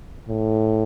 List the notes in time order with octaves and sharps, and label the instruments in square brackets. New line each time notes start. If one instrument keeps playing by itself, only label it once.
[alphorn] A2